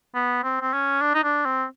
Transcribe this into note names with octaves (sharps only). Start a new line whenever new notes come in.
B3
C4
C4
C#4
D4
D#4
D4
C4